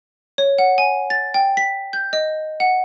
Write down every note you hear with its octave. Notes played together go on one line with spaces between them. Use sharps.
C#5
F#5
G#5
A6
G5
B6
G6
D#5
F#5